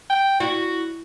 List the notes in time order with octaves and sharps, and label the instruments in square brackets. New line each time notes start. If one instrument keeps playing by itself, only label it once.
[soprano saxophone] G5
[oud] E4 [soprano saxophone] F#4